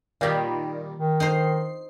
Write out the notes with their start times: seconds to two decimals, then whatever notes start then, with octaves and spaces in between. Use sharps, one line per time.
0.21 A#2 D#3 G3 F4 G4
0.96 D#3
1.20 D#4 C5 C7